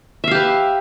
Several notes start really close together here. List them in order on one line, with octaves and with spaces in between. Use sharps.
E5 F5 G4 B4